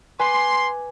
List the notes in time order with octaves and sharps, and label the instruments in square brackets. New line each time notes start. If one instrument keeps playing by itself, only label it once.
[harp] B4 G#5 D6 [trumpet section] C6